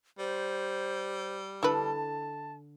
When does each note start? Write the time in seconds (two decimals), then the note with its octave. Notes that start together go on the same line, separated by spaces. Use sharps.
0.18 G3 C5
1.63 D3 E4 A4 B4 A5